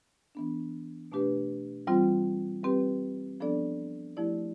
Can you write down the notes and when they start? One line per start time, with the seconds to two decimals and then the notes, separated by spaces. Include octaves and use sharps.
0.35 E3 B3 D4
1.12 B2 A3 D4 G4 B4
1.87 E3 G3 C4 F4 C5
2.63 G3 C4 G4 B4
3.40 F3 B3 D4 A4 D5
4.17 F3 A3 E4 G4 D5